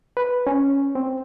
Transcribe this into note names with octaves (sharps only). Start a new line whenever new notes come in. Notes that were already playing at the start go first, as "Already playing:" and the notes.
B4
C#4
C4